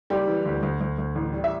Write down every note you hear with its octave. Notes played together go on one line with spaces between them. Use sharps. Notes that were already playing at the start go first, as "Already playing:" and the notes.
F#1 G3 G4
E3
D2
D2
D2
D2
A1
G3
E5